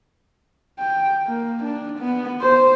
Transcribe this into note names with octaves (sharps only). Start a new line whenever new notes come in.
G5
A#3
D4
B3
C5